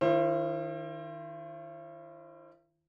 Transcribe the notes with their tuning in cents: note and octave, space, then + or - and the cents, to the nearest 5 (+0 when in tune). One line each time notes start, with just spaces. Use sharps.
D#3 +0 E4 +45 C5 +35